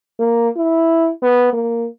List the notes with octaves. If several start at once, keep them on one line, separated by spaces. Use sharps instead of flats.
A#3
E4
B3
A#3